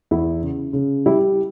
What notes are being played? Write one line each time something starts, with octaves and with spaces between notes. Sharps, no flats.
E2 E4
C#3
C#3
G3 E4